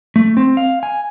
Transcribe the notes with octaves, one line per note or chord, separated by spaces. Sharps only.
A3
C4
F5
G#5